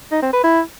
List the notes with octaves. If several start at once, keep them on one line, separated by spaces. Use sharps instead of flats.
D#4
C4
B4
E4